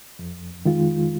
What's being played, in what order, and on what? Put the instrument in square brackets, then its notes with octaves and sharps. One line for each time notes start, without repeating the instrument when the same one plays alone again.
[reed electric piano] F2
D#3 G#3 F4